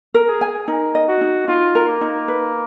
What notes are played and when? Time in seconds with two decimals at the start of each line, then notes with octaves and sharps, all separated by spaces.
0.14 A#4
0.28 G#4
0.41 G#5
0.68 D#4 A#4
0.95 D#5
1.08 F#4
1.21 D#4
1.48 D#4 F4
1.75 A#4
1.88 A#3
2.01 D#4
2.28 B4